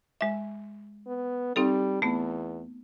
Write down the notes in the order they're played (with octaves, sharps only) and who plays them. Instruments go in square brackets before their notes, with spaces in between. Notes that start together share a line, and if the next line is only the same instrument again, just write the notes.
[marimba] G#3 E5
[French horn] B3
[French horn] G3 [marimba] C4 D#4 A4
[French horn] E2 [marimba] A3 B3